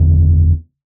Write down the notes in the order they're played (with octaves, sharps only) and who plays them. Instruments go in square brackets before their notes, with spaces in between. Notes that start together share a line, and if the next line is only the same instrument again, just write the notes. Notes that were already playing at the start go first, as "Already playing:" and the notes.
Already playing: [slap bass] F#1 E2 D3